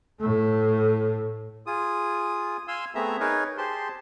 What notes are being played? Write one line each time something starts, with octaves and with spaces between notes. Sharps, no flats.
A2 A3
F4 G#4 D#6
F5 G#5 C6 E6
A3 B3 C4 G#4 E5 A#5
D#4 G#4 A#4 B4 C#5
G4 G#4 C5 A5 C6